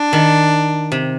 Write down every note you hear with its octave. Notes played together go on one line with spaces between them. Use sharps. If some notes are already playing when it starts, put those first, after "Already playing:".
Already playing: D4
D#3
C3